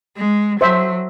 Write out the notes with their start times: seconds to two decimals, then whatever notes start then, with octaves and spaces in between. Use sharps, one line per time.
0.17 G#3
0.61 F#3 C5 E5